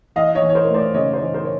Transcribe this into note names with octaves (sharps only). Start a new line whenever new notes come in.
E3 D#5 F5
C#5 D#5
E3
C#5
A#4 C5
A3
C5 D5
C#3 C#5 D#5
C5 D5
E3
A#4 C5
C#5